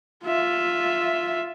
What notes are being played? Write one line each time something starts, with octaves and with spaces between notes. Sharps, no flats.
F4 E5